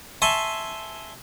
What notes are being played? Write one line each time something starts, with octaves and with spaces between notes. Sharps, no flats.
E5 G#5 A5 C6 C#6